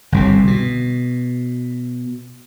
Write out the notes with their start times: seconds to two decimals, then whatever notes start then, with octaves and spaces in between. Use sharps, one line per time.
0.12 G1 C2 C3
0.47 B2